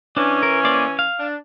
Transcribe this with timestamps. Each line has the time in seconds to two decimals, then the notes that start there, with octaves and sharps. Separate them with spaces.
0.17 E3 C#4 D4
0.43 A#4
0.64 A#3 C5 D5
0.99 F5
1.19 D4